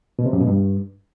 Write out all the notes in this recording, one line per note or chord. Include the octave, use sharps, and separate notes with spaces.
B2
C3
F#2
B2
G2